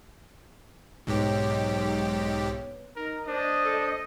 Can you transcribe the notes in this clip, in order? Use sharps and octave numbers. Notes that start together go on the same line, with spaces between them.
B1 G#2 B3 G4 B4 C#5
D#4 A#4
D4 C5 D#5
A4